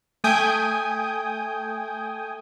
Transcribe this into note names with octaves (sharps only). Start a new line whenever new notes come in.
A3 G5 G#5 D#6 G6